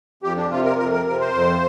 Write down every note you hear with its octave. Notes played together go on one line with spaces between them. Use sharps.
F2 G4
D4
C3 F4
A#4
F2 A#4
A#4
C3 A#4
C5
F2